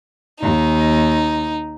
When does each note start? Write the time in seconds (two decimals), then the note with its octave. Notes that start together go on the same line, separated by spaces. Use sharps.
0.40 D#2 D#4